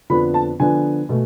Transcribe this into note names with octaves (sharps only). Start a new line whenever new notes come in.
F2 D3 F3 B3 D4 B5
A5
D3 F3 B3 D4 G#5
B2 A3